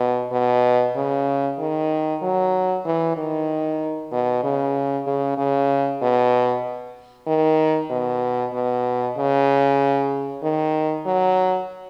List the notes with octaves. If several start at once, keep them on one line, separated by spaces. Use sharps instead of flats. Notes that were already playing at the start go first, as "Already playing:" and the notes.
Already playing: B2
B2
C#3
D#3
F#3
E3
D#3
B2
C#3
C#3
C#3
B2
D#3
B2
B2
C#3
D#3
F#3